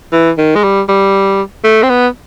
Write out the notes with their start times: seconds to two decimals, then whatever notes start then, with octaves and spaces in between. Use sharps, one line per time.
0.13 E3
0.38 D#3
0.55 G#3
0.63 G3
0.89 G3
1.64 A3
1.83 C4
1.90 B3